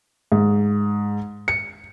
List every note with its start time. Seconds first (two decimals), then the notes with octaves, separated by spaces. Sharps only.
0.32 G#2
1.48 C#7